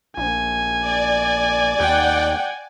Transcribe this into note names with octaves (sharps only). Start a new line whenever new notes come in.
A#1 G#5
D5
D#2 F#5 G5